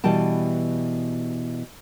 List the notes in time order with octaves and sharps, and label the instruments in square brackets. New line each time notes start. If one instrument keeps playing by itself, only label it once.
[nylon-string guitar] B2 E3 G3 G5 A5